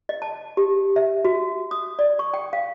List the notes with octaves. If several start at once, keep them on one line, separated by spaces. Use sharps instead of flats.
D#5
A5
G4
E5
F#4
D#6
D5
C#6
G5
F5